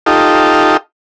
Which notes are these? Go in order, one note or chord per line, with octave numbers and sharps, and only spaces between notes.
D#4 F4 G4 A4